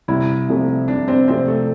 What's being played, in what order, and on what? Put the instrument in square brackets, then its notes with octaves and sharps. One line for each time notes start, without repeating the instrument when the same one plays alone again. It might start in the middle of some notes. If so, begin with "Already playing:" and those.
[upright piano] C2 [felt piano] E4
[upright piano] C3 F3 A3
[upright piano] C2 [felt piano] D4
[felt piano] C4
[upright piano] C3 F3 A3 [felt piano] C4
[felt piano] A3